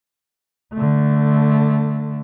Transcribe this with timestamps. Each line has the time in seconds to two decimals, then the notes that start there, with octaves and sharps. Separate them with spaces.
0.73 D3 A3